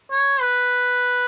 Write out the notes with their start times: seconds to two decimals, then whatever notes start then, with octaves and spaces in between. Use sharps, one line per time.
0.12 C#5
0.41 B4